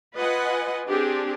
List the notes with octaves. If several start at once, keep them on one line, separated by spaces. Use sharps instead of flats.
F4 B4 D#5 F#5 G#5
C4 D4 G4 G#4